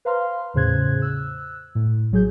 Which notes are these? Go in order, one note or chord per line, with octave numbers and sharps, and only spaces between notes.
B4 C5 F5 A#5 C6 F6
E2 A2 C#3 C5 F#6 G#6
E6 F#6
A2
A#1 F#3 G#4 G6